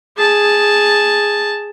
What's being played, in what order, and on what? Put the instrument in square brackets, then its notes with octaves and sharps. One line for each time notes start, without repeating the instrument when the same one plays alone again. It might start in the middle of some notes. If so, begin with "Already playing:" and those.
[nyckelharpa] G#4 A5